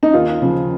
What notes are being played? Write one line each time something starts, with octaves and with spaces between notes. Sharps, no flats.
D#4
D#2 F4
C#3 F3